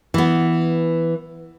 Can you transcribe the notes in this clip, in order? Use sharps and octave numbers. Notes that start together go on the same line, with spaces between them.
E3 B3